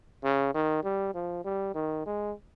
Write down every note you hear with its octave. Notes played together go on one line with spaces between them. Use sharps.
C#3
D#3
G3
F3
G3
D#3
G#3